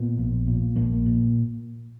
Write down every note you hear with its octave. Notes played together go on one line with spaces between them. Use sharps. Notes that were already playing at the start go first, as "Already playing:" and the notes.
Already playing: A#2 B3
A#1
A#2
A#1 A#3
A#2